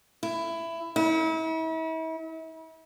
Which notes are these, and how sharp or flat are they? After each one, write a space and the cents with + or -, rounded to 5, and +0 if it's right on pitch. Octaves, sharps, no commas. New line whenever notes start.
E4 +15
E4 -40